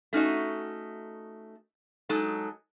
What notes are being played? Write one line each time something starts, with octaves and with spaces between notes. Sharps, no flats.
A3 C#4 D#4 F#4 D#5
F#3 G#3 D#4 A4